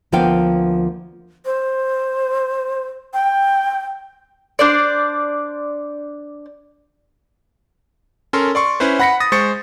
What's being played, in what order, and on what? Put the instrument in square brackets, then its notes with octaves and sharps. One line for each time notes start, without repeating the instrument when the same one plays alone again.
[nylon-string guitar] D2 F3 A#3 B3 F5 G5
[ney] C5
G5
[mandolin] D4 C5 D5
[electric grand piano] C#4 A4 A#4 C6
D5 C6 C#6
C#4 E4 B4 C5
F#5 B5 A#6 B6 C#7
D#6 A6 A#6
G#3 C5 C#6 A6 C#7